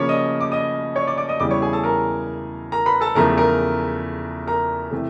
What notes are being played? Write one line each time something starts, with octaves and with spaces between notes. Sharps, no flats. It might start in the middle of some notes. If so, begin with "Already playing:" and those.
Already playing: C#3 F3 A#3 C#4 C#5 D5 C#6 D6
D#5 D#6
D6
D#5 D#6
C#5 C#6
D5 D6
D5 D6
D#5 D#6
E2 C#3 E3 G3 D5 D6
C#5 C#6
G#4 G#5
A4 A5
A#4 A#5
A#4 A#5
B4 B5
A4 A5
E2 C#3 F3 A3 A#4 A#5
A#4 A#5
A#4 A#5
C3 E3 A3